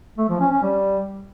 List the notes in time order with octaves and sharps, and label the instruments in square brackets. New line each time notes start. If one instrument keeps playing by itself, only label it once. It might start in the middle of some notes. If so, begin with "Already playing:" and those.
[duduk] A3
F3
C#4
C#4
G3